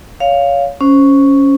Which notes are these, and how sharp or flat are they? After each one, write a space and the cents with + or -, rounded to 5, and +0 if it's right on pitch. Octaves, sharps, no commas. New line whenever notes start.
C#5 +20 F5 +0
C#4 +0 C5 +0